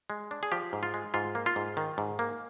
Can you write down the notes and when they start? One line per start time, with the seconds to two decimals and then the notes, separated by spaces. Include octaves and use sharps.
0.10 G#3
0.31 D4
0.43 G#4
0.52 F3 G4
0.73 G#2
0.83 F4
0.94 G#3
1.14 G#2 F4
1.35 A#3
1.46 F4
1.56 G#2
1.77 D#3
1.98 G#2
2.19 A#3